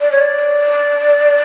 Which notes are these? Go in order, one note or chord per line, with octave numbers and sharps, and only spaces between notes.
D5
C#5
D5